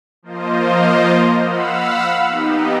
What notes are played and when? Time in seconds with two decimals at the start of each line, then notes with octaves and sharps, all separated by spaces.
0.23 F3 A#3 F4 C5 D#5
1.39 F5 F#5 B5 E6
2.28 B3 D#4 G4